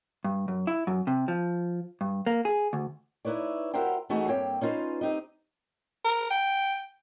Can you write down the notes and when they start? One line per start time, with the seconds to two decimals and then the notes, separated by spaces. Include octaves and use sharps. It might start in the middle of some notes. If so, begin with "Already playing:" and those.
0.24 G2
0.48 F#2
0.67 E4
0.87 F#2
1.07 C3
1.28 F3
2.01 G2
2.26 A#3
2.45 G#4
2.73 D2
3.25 D#4 E4 B4 C#5 D5
3.74 E4 F#4 G4 A#4 C5 G5
4.09 E3 A3 D#4 F#4 G#4
4.28 G2 A#3 C4 C#5 E5 G5
4.61 C#4 D#4 F4 B4 C5
5.01 C4 D#4 G4 D#5
6.04 A#4
6.30 G5